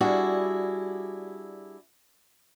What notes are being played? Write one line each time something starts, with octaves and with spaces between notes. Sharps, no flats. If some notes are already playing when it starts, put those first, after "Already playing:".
G3 D4 E4 F#4 G#4